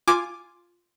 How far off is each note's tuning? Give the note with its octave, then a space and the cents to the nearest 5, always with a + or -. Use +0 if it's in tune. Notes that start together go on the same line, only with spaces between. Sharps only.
F4 +0 G#5 +0 D6 +5